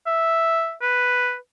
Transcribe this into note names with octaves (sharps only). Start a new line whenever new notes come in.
E5
B4